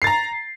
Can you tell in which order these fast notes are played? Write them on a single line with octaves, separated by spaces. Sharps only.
C7 A6 A#5